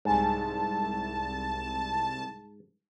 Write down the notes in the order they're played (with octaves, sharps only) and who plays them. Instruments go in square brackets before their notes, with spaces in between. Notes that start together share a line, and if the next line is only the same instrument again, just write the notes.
[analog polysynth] C2 A5 [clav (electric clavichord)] G#2